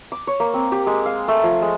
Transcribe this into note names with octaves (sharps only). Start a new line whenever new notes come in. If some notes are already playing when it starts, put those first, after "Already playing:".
D6
C#5
A#3
C4
G4
G#3
F5
A3
F3
G#3